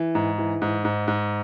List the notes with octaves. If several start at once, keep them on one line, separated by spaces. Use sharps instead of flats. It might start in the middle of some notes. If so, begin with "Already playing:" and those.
Already playing: E3
G#2
E3
G#2
G#2
G#2